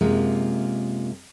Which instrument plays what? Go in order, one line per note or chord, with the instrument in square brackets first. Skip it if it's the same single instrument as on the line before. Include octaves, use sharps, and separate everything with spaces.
[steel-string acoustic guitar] F#2 C3 G#3 A#3 F4